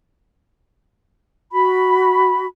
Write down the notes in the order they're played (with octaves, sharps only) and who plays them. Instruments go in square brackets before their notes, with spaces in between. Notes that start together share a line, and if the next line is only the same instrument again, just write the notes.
[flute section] F#4 B5